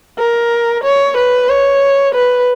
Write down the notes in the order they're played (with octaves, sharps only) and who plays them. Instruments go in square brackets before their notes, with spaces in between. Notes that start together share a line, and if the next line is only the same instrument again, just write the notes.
[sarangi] A#4
C#5
B4
C#5
B4